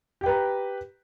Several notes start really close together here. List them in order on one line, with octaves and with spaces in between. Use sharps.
G4 G5 B4 A#5